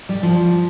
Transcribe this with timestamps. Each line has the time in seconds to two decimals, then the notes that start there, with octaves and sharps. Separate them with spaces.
0.09 G3
0.23 F3